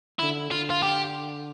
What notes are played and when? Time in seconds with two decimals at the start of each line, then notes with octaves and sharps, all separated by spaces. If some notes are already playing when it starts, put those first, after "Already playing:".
0.19 D3 E4
0.51 D3 F4
0.70 F4
0.83 G4